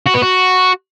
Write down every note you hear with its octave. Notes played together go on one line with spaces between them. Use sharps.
F#4
B3
F#4